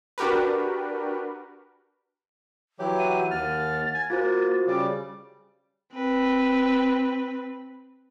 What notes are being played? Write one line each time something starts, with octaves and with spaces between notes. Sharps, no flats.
D4 F#4 G4 A#4 B4
E3 F#3 G4 C#5
F#5 D#7
D#2 F6 A6
G#5
A#3 F4 F#4 C5
C#3 G3 D6
C4 B4